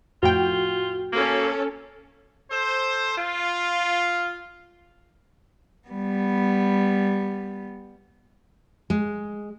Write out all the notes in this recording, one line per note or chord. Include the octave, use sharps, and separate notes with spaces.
F2 A2 F4 F#4 G5
A#3 C#4 A4
A4 C5
F4
G3 B3
G#3